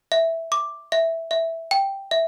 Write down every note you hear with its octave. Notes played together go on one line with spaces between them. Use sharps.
E5
D6
E5
E5
G5
E5